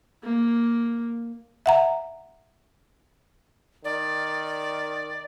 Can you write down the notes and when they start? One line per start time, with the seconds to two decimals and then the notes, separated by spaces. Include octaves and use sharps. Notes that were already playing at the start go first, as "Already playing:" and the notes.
0.23 A#3
1.66 E5 F#5 A#5
3.84 D#3 D5